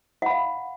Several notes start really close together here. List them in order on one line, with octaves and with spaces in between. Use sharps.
F#5 B5 F5